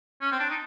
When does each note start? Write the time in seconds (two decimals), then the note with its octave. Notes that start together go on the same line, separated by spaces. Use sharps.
0.21 C#4
0.32 C4
0.40 D4
0.50 D#4